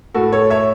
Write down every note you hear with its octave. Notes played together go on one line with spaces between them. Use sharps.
A2 F#4 A4
A4 C#5
C#5 E5